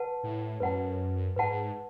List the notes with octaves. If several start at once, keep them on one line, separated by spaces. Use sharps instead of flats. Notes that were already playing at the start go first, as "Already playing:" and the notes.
Already playing: B4 F#5 A5
A2
F#2 B4 F#5 A5
G#2 B4 F#5 A5